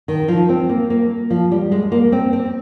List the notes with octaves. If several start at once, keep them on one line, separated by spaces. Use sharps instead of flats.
D#3
F3
C4
A#3
A#3
F3
G3
G#3
A#3
C4
C4